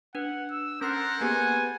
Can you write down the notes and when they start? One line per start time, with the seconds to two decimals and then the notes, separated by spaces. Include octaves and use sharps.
0.15 D4 B4 F#5
0.51 E6
0.81 C#4 A4 A#4 C5 F#5 C6 C7
1.21 A#3 B3 G4 G#4 G#5